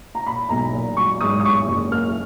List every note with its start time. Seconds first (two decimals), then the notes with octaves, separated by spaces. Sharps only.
0.15 A#5
0.27 A#2 B5
0.49 B1 A#5
0.73 A#2
0.97 F#3 C#6
1.21 G#2 D#6
1.40 D#6
1.44 G#2 C#6
1.68 F#1
1.92 A#3 F6